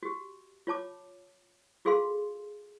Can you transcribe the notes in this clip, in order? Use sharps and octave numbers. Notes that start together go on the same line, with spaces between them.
F#4 G4
F4 C#5 A5 D6
F4 F#4 G#4 A4 F5 C6